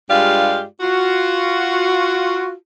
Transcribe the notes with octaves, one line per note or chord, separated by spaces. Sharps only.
G2 G#3 F4 G4 D5 F5
F4 F#4